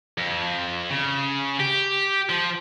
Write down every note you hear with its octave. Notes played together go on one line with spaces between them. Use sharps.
F2
C#3
G4
F3